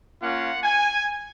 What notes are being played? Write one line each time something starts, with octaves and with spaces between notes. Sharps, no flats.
A#3 C#4 F4 F#5
G#5